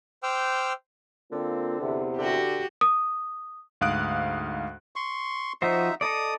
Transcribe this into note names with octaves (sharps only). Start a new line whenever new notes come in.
C5 G5 D6 E6 F6
D3 A#3 C4 F4
E2 C3
D3 F#4 G4
D#6
D2 G#2 F5 D#6 F#6 D7
C6 C#6
F3 D#4 F#4 C5 E5
D#4 A4 D5 D#6